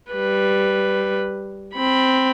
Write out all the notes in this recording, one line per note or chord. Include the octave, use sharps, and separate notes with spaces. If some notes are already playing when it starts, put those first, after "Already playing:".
G3 B4
C4 B5